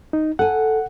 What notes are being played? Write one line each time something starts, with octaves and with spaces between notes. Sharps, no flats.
D#4
A4 F#5 G#5